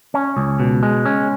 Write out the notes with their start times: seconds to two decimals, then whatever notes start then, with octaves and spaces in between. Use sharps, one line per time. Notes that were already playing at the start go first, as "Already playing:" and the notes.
0.14 C#4
0.37 C#2
0.60 B2
0.83 G#3
1.06 C#4